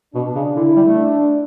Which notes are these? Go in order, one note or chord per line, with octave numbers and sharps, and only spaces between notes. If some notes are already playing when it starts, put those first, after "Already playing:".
B2 D4
C#3
D3 E4
G3
A3
D4